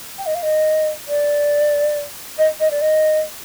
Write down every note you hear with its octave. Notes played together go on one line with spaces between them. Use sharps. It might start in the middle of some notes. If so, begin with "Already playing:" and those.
G5
D#5
F5
D#5
D5
D#5
D#5
D5
D#5